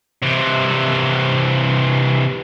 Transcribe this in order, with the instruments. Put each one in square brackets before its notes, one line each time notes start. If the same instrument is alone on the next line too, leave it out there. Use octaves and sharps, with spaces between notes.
[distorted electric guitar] C3 E3